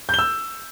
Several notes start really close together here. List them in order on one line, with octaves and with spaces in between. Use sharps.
G6 G7 E6